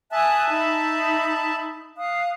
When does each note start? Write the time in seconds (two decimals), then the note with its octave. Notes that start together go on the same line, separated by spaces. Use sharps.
0.12 E5 G#5 A5 D#6 F#6
0.50 D#4 B5
1.98 F5 D#6 F#6